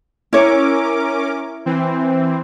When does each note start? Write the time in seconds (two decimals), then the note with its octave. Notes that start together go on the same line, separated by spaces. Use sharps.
0.33 C#4 E4 A#4 C#5 D6
1.66 E3 C4